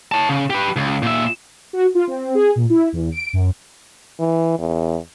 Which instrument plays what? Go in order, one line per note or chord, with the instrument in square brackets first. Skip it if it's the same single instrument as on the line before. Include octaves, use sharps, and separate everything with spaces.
[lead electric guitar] C#5 A5
C#3
G4 B4
C#2
A#2 E5
[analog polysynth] F#4
F4
C4
G#4
A#2
E4
E2
D7
F#2
[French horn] E3
E2